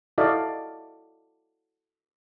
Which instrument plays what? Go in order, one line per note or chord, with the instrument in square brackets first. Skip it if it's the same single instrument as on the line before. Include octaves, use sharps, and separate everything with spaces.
[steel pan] E4 F#4 A4 D5 D#5 F5